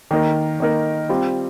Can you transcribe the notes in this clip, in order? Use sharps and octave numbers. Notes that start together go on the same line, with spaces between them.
D#3 A#3 D#4 A#4
D#3 A#3 D#4 A#4
G3 C4 F4